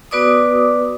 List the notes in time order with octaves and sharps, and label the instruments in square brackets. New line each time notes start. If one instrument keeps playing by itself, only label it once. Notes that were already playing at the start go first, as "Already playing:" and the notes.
[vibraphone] B3 F#4 B4 D5 D6 D#6